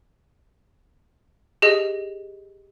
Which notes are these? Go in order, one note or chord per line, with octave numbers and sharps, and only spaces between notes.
G4 G#4 D#5